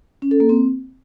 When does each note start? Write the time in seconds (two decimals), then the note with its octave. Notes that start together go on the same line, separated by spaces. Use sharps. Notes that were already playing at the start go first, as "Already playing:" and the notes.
0.22 C#4
0.31 A4
0.40 A#3
0.49 C4